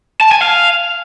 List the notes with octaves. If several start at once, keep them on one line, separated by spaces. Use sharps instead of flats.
A5
G#5
F5